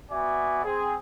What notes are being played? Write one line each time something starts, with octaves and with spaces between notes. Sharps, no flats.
B3 F#4 D5 E5 G#5
C4 G#4